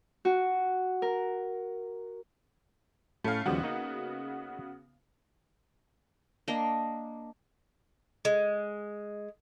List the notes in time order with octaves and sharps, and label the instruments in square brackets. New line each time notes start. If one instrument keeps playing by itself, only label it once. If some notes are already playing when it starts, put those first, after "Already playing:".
[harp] F#4
A#4
[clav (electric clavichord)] A2 [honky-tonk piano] A3 C#4 F5
[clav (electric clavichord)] D#2 F3 G3 [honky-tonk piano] C#3 B3 F#4
[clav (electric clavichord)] A#3 D#4 D#5
[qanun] A#3 D4 D#5
[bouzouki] G#3